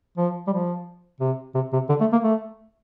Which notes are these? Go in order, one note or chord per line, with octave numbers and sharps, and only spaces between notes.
F3
G3
F3
C3
C3
C3
D3
A3
A#3
A3